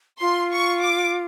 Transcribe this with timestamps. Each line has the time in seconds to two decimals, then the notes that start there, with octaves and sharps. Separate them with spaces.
0.20 F4 C6
0.52 C#6
0.83 D6